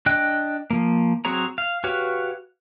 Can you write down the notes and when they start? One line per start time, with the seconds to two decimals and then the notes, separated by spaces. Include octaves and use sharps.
0.06 D4 D#5 G5 F#6
0.71 F3 A#3
1.25 F#3 C4 G#4 C#5 A#5
1.58 F5
1.84 F#4 G4 B4 C#5 F5